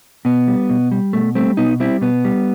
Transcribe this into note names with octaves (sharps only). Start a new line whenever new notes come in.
B2 B3
G3
B2
G3
B2 A3
G3 A3 C4
B2 B3 D#4
G3 C4 E4
B2 B3
G3